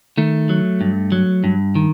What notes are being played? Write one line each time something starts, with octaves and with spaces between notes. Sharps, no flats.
D#3 A3
F#3
G2
F#3
G2
D#3